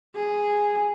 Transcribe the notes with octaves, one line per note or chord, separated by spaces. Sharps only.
G#4